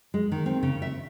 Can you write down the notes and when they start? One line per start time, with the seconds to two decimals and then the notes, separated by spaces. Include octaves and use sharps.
0.14 G#3
0.32 D#3
0.46 C4
0.63 C#3
0.82 E5